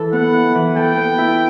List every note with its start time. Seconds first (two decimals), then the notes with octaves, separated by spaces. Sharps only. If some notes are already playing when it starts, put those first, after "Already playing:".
Already playing: E3 E4 A4
0.13 B3 F#5
0.34 E4
0.55 E3
0.76 A4 G5
0.97 B3
1.18 E4